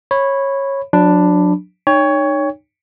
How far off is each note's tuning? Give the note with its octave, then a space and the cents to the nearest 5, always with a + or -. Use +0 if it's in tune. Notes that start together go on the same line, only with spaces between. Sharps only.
C#5 -15 B5 +0
F#3 -35 D4 +5 B5 +0
D#4 -35 C#5 +15 G5 +35